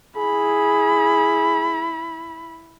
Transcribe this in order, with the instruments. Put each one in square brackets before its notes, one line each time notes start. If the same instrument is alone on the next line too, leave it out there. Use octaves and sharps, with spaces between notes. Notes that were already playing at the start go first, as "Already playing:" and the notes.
[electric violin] E4 B5 [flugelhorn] G#4